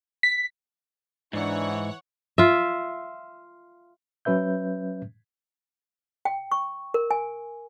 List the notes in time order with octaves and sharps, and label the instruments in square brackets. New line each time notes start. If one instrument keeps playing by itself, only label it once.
[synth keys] B6
[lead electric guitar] G#2 [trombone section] E3 [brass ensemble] D4 D#4 [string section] C#5 F#5 C#6
[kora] F4 E5
[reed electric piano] F#3 C#4 B4 E5 G6
[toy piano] G5
C#6
A#4
G#5